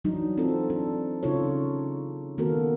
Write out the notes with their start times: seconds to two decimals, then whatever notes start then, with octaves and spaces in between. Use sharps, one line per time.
0.04 E3 F#3 D4 D#4
0.38 C4 D#4 F4 A4
0.70 D4 A4
1.23 C#3 D#4 F4 A4 C#5
2.38 D#3 A#3 B3 F#4 A4 A#4